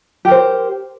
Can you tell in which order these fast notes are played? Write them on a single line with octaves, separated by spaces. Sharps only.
G4 A#4 C5